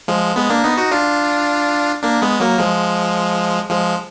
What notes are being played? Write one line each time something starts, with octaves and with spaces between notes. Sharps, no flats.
F3 G#3
G#3 B3
A#3 D4
B3 D#4
D#4 F#4
D4 F4
A#3 D4
G#3 B3
F#3 A#3
F3 G#3
F3 G#3